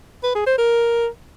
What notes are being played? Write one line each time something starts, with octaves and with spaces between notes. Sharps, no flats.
B4
G#4
C5
A#4